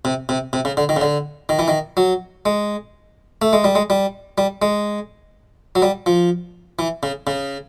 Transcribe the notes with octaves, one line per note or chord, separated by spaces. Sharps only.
C3
C3
C3
C#3
D3
D#3
C#3
D3
D#3
E3
D#3
F#3
G#3
A3
G#3
G3
G#3
G3
G3
G#3
F#3
G3
F3
E3
C#3
C#3